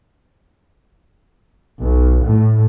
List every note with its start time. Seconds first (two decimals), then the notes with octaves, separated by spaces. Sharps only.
1.81 B1
2.23 A2